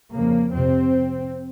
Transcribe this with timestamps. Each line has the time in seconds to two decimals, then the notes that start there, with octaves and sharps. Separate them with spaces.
0.15 F2 C#3 A#3
0.53 F2 C3 C4